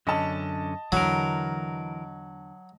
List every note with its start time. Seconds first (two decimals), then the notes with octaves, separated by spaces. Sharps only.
0.07 F#2 D3 C#4 D#5 A5
0.92 E2 D3 E3 F#3 A#4